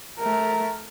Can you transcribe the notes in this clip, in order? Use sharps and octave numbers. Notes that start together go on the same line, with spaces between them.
A3 A#4